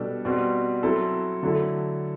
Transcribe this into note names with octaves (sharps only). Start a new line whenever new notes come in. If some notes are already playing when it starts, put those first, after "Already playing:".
Already playing: B2 G3 D4 A4
B2 G3 C4 F#4
F#3 C4 E4 A4
D3 F#3 A3 E4 A4